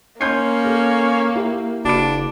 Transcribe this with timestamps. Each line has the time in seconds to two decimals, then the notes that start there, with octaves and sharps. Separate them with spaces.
0.21 A#3 C#4 C6 G6 C7
0.65 A4
1.35 E4 G4
1.85 F#1 D4 F#4 B5 D7